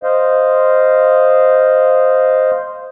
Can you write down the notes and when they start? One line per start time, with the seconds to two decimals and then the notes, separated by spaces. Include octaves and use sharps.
0.03 C5 D#5 F5